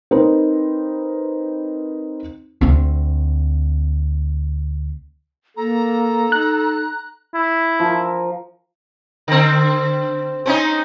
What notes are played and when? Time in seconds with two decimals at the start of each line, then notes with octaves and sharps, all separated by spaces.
0.11 C4 D#4 A#4 B4
2.61 D2 C4
5.57 A#3 A4 A#5
6.32 D#4 F#6
7.34 E4
7.79 F3 A#4
9.28 D3 C4
10.46 C4 C#4 D#4